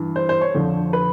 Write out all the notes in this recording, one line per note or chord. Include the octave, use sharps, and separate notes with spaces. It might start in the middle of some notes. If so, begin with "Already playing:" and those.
Already playing: G2 E3
C5
C5
C#5
F2 D3 F3
B4